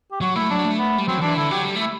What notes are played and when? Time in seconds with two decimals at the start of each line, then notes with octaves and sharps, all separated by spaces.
0.12 G4
0.21 F#3 F#4
0.36 A3 E4
0.50 F#3 D4
0.65 A3
0.79 B3
0.98 G3
1.07 F#3 C4
1.18 D3
1.21 E3 D4
1.36 D3 E4
1.51 F#3 G4
1.65 G3
1.75 A3
1.80 E4